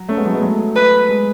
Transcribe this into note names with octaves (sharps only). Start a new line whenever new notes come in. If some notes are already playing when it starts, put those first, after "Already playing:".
Already playing: F#3
A3 C#4
G#3 B3
F#3 A3
G#3 B3
F#3 A3
B4
G#3